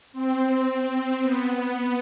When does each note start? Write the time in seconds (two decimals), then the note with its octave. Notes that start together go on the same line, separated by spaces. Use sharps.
0.12 C4
1.22 B3